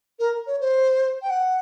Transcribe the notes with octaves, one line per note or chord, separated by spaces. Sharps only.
A#4
C#5
C5
G5
F#5